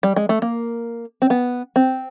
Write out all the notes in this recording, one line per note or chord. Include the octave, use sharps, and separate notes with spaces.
G3
G#3
A3
A#3
C4
B3
C4